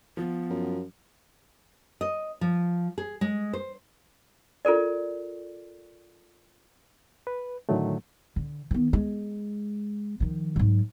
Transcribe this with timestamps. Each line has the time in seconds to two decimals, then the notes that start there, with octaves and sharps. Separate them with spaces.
0.17 F3 B3
0.50 F#2
2.01 D#5
2.41 F3
2.98 G#4
3.21 G#3
3.53 C5
4.65 F4 A4 A#4 D5
7.27 B4
7.69 A2 D3 D#3 F#3 A3
8.36 D3
8.71 D#3 B3
8.93 G#3
10.20 D#3 F3
10.56 G#2 F#3